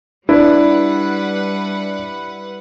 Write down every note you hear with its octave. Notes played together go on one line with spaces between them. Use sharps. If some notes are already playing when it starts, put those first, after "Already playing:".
G3 D4 E4 B4 F#5